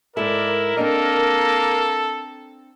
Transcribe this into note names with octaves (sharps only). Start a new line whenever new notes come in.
G#2 E4 A4 A#4 D5
A#3 C4 D4 A4 D#5